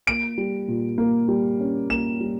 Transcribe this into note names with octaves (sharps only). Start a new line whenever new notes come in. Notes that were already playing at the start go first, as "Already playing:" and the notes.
A#3 D7
G3
A#2
A#3
G3
C#4
A#3 E7
G3